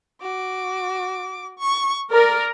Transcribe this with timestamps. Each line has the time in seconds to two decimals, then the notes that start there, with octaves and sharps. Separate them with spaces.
0.22 F#4 D6
1.58 C#6
2.11 A#4 D5